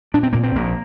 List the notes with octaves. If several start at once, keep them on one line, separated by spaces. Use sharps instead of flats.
A#2 D4
C4
A#2 A#3
C4
A#1 A#3